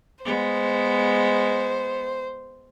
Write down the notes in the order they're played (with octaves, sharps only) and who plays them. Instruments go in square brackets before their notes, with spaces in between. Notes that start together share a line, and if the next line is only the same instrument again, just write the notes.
[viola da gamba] G#3 B3 [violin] C5